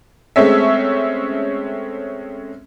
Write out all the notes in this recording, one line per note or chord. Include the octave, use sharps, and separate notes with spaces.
G#3 A3 C4 C#4 E5